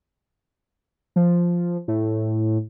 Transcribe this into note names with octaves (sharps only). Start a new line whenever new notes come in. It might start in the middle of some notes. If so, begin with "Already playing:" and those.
F3
A2